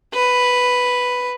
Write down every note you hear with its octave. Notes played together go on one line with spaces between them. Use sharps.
B4